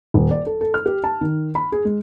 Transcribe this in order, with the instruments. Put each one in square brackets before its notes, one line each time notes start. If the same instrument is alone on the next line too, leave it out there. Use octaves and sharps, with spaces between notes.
[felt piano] D#1
D5
A4
A4
F6
G4
A5
D#3
B5
G#4
G#3